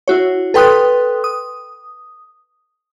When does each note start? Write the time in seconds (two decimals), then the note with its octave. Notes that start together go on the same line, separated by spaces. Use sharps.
0.08 E4 F#4 C#5
0.54 A4 B4 G5 C6 D#6 F#6
1.24 D#6